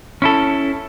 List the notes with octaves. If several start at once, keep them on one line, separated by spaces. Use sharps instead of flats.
C#4 E4 A4